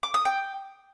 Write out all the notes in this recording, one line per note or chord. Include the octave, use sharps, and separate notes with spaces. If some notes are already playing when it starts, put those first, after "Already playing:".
D6
D#6
G5